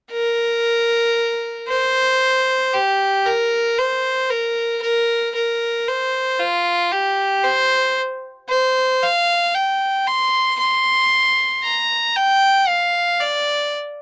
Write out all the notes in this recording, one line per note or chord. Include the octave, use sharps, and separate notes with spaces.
A#4
C5
G4
A#4
C5
A#4
A#4
A#4
C5
F4
G4
C5
C5
F5
G5
C6
C6
A#5
G5
F5
D5